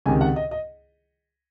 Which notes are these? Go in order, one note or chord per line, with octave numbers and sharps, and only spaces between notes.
C#2 C3 D#3 G#5
F#5
D#5
D#5